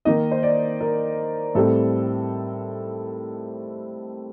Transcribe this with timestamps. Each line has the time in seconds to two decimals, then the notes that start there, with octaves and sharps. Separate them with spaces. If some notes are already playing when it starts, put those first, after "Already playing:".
0.05 D#3 A#3 D#4 D#5
0.32 C5
0.43 D5
0.81 A#4
1.55 A2 G3 C4 A4